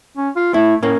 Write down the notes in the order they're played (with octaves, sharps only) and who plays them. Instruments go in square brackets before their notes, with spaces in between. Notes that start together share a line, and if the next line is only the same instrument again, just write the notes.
[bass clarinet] C#4
F4
[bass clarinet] A3 [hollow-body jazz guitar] E4
[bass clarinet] A2 [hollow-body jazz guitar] A#3 C#4